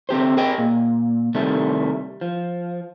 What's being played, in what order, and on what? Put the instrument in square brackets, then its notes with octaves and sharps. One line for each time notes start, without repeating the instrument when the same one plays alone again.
[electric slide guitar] D3 C4 G4 C5
G#4 A#4 D#5 G5
A#2
C3 D#3 G3 A3
F3